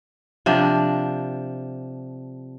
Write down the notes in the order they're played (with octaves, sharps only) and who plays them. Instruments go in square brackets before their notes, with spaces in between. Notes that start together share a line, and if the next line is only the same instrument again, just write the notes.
[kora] C3 F3 D4